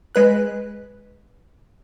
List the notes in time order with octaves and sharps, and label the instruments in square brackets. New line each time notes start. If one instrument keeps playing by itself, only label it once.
[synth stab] G#3 B4 F#6